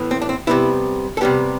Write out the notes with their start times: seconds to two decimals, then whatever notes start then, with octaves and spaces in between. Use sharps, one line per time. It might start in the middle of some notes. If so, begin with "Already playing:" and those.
Already playing: A2 E3 B3
0.11 C4
0.22 D4
0.29 C4
0.47 C3 G3 B3 E4
1.17 A4
1.21 C3 G3 B3 G4